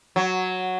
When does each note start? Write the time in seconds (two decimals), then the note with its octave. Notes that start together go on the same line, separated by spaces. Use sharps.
0.16 F#3